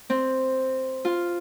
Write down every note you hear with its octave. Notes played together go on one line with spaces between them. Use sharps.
C4
F4